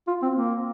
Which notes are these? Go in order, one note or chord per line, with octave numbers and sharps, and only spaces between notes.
F4
C4
A#3